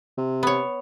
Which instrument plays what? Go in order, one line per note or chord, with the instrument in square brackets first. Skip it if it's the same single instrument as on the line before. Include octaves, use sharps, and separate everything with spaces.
[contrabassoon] C3
[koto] B3 C#5